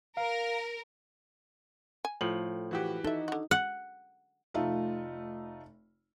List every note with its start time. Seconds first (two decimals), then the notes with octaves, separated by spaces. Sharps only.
0.17 A#4 F5
2.05 G#5
2.21 A2 F3 F#7
2.71 E3 F#4 G4
3.04 D#4 A4 E5
3.28 D3 F#4
3.51 F#5
4.54 F1 A3 D#4 F4 E5